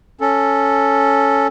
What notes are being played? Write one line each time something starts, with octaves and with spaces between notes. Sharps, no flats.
C#4 A4